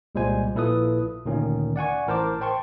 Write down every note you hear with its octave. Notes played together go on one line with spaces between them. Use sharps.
C2 A#2 G3 G#3 C5 G#5
A#1 A#2 E4 A4 B4 D#6
D2 A#2 D#3 C#4
D5 F#5 G#5 C#6
A1 A2 A#4 C5 A5 D6
C5 G5 A5 C6 C#6